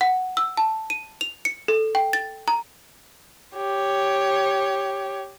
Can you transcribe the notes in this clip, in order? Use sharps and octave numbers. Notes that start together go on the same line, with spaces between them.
F#5
E6
A5
D#7
F7
C#7
A4
G5
A6
A#5
G4 C#5